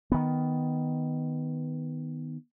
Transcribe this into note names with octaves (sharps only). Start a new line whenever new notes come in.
D#3 B3